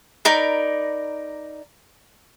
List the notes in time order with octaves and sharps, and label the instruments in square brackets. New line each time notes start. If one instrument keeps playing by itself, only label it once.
[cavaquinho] D#4 A#4 D5 B5